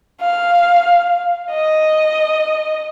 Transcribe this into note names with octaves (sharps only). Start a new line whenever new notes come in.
F5
D#5